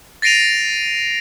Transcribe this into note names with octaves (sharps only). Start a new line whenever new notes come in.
A6 A#6 C7 D7 D#7 F7